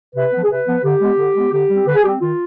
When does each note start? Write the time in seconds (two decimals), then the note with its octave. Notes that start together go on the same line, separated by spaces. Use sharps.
0.15 C3 B4
0.32 F3 B3
0.43 G#4
0.50 C3 B4
0.67 F3 B3
0.83 D3 G4
1.01 G#3 B3
1.18 D3
1.35 G#3 B3
1.52 D3 G4
1.69 G3 C4
1.86 D3 B4
1.95 G#4
2.03 G3 G4
2.08 C4
2.21 D#3 F4